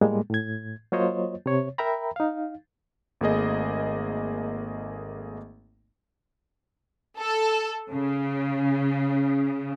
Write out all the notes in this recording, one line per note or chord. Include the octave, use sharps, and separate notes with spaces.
A2 G3 G#3 A#3
A2 G#6
F#3 A#3 F4 C5 C#5 D#5
C3 C#5
A#4 E5 G5 A#5 B5
D#4 F5
G#1 A3 A#3 G#4 D#5
A4
C#3